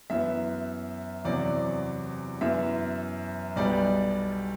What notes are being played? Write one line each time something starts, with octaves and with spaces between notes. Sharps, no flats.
F#2 E3 B3 E5
E2 C3 F#3 D5
F#2 E3 B3 E5
B1 B2 G3 B3 D5